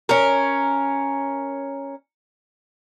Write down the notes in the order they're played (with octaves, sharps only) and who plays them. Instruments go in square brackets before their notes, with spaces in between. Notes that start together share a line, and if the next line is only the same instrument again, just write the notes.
[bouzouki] C#4 A#4